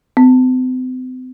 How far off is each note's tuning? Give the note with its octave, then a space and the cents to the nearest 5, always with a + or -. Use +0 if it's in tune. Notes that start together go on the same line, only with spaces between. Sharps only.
C4 -40